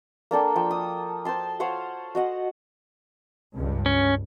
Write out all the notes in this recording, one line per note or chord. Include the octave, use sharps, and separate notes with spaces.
A#3 D4 A4 G5
F3 G5
D#6
C5 G5 A5 C6
C5 C#5 F5 F#5
F#4 D#5 F#5
C#2 G2
C#4